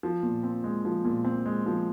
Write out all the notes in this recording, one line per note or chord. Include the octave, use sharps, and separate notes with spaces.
F3
A#2
C4
G#3
F3
A#2
C4
G#3
F3